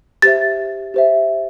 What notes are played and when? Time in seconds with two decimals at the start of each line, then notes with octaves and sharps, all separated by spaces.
0.22 G4 C5 E5 A6
0.94 G4 C5 E5